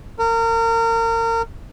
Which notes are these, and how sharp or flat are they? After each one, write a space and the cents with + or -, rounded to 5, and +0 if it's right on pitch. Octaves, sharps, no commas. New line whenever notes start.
A#4 -30